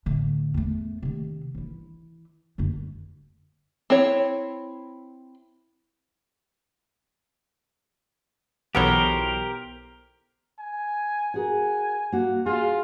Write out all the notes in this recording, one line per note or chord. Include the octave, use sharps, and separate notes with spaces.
A2 D3
E2 A3
C3 D#3
E3 E4
F#2 D3
C4 E4 C#5
B1 E3 B3 G4 A4 A#4 C5 C#5
G#5
F#4 G#4 A#4 G#5
A#3 F#4
F4 F#4 G#4